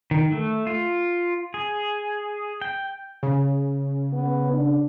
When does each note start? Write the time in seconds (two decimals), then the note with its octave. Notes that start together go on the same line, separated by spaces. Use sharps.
0.11 D#3
0.32 A3
0.67 F4
1.54 G#4
2.61 G5
3.23 C#3
4.13 B3
4.53 D4